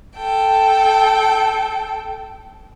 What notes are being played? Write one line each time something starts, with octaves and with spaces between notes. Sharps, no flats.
A4 G5